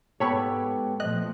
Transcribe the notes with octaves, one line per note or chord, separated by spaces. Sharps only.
G#2 B3 G4 A4 C#5 B5 C#6
A#2 F3 A3 D#5 F#6